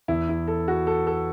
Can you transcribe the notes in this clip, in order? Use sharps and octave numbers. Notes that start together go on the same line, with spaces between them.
E2 E3 E4
E4
A4
F#4
A4
A4